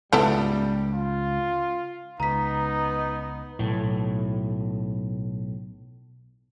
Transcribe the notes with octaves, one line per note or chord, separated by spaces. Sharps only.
C#2 G#2 C#3 G3 B3 E4 A4
F4
C#2 B3 D#4 A#5 B6
B1 A2